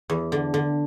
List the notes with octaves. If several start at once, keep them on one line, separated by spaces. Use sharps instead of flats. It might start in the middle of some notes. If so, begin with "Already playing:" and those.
E2
D3
D3